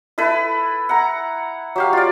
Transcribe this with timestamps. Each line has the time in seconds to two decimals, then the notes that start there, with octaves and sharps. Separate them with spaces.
0.18 E4 A4 B4
0.89 F#5 A#5
1.76 F#3 G4 F5
1.93 F4 D5